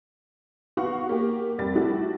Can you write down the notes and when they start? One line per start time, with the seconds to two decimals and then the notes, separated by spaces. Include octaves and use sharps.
0.77 B3 F#4 F5 F#5 C#6
1.09 A#3 G4
1.58 F1 G3 A6
1.75 A3 E4 F#4 G4